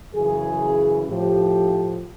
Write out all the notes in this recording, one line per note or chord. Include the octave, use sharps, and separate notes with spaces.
F#2 C#3 E3 G#4
A2 F3 G4